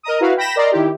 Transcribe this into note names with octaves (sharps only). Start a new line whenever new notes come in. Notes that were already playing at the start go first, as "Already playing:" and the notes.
A#4 D#5 A#5 D#6
E4 F#4 B4 F5
G5 B5 G6 A#6 B6 E7
A#4 D5 D#5 A#5 C6
D#3 E4 G4